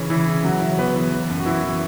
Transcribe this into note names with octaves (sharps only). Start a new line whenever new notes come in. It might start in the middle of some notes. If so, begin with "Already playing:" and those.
Already playing: C#3 E3 C#4
C#3 E3 E4
C#3
E3 F#3 F#4
E3 E5
C#5
E3 B3 B4
E3
E3
F#2
F#4
E3 E4
E3